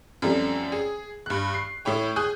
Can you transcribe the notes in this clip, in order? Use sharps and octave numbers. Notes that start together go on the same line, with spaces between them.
F#2 F3 G3 A3 C4
G#4
G2 F#6
C7
A2 E4 C#5 G5
G#4 G#5 D#6 F#6 G6